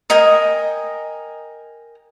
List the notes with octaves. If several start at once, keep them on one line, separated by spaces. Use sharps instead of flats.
A#4 D#5 G5 G#5